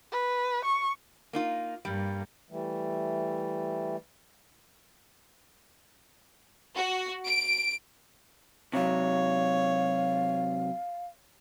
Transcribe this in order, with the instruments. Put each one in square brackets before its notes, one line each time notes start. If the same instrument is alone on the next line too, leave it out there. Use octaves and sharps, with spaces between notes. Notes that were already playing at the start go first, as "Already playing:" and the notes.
[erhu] B4
C#6
[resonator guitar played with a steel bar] A#3 D#4 F4
[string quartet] G2 A#3 [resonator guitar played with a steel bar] G3
[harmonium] E3 G3 A3
[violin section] F#4
D7
[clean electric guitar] C3 F#3 [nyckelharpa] C#5 [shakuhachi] F5